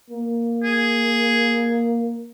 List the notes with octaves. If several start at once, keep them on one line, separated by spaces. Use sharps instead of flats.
A#3
G#4